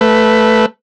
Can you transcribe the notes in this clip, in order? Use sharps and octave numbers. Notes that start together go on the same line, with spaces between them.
A3 B4